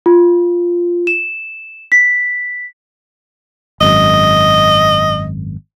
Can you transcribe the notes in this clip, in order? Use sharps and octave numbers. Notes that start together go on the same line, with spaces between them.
F4
E7
B6
G#1 F#2 D#5